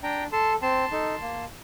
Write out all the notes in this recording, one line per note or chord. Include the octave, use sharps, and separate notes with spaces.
D4 G5 A#5
A4 A5 C6
C4 A5 C6
D#4 A4
A#3